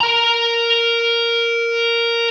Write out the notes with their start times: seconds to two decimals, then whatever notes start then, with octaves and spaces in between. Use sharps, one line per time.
0.01 A#4 A#5